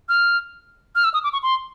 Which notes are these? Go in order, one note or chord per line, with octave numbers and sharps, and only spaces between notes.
F6
F6
E6
D#6
D6
C#6
C6